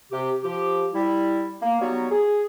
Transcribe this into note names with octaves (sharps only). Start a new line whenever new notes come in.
C3 G4
F3 G4
G3 E4
A#3
F#3 G3 B3 D#4 F#4 C#5
G#4